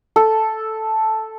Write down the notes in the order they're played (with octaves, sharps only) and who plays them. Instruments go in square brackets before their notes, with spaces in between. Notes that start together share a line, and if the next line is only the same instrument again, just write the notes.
[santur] A4